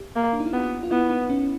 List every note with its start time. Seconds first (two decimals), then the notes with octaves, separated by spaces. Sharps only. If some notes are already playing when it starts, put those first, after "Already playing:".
Already playing: G4
0.16 A#3
0.33 D4
0.40 D#4
0.46 E4
0.53 B3 F4
0.83 F4
0.91 B3 E4
1.10 D#4
1.30 C#4